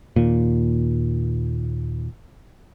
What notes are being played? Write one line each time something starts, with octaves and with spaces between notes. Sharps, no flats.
D#2 A#2